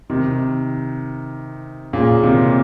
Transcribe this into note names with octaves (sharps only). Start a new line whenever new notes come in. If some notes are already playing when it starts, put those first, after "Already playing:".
C3 D#3
A#2 C#3
C3 D#3